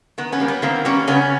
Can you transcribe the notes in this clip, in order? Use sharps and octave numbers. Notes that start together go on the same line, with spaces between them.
D#3 B3
B3 C#4
G3 A#3
B3
D#3 A#3 C4
G3 A#3 B3 C#4
C#3 B3 C#4